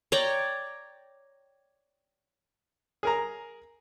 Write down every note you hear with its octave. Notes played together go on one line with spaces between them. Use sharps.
C#5 D5 G5 A#5
G#4 A#4 A#5